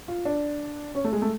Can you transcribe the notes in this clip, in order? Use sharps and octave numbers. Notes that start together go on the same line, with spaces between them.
F4
D4
C#4
A3
G#3
A3